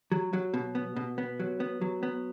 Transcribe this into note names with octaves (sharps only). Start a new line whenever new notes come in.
F#3
F#3
B2
B3
B2
B3
F#3
B3
F#3
B3